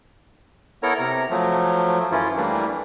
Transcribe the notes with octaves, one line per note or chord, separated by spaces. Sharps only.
B3 E4 A4 A#4 C#5 A#5
C3 A#5
F3 F#3 A3
F#2 E3 C#4 E4 F4
E3 G3 A3 A#3 D4